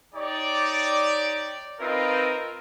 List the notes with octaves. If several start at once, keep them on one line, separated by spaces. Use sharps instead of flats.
D#4 G4 C#5 D5
C4 D#4 F4 A#4 B4